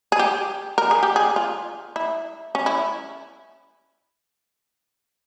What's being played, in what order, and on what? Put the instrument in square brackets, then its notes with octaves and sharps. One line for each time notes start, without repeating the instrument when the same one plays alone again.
[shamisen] G#4
G4
A#4
G#4
G4
G#4
F4
E4
C#4
E4